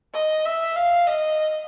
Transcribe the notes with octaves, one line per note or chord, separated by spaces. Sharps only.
D#5
E5
F5
D#5